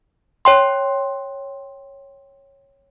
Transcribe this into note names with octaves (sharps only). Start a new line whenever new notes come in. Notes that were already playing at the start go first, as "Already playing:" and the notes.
C#5 G5 C6